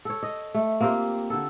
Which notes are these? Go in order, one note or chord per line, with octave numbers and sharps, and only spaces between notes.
A4 C#5
D#5
A3
A#3 C4 F4 G4
D3 A4